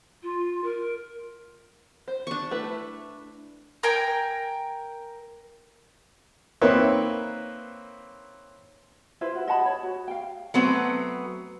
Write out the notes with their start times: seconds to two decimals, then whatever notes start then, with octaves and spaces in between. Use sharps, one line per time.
0.22 F4
0.64 A#4
2.08 C5
2.27 D4 C#6
2.51 A3 E4 B4
3.83 A#4 G5 G#5
6.61 A#3 C4 D#4 B4 C#5 E5
9.21 E4 F4 B4 C5
9.35 F#4
9.47 D#5 F#5 A5 B5
9.66 C#5
9.83 F#4
10.08 F5 G5
10.54 F#3 A3 B3 C4